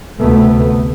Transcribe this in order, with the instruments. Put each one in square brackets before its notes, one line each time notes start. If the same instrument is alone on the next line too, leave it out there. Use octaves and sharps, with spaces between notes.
[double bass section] D2 C3 A3 B3